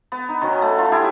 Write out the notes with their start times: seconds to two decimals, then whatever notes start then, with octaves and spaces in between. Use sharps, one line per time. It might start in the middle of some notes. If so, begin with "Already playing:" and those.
0.12 B3
0.29 D#4
0.41 D#3 F#3 C#4
0.62 A3
0.78 F4
0.92 E4 G4 G#4